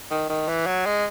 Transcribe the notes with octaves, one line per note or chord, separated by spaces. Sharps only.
D#3
D#3
E3
F#3
G#3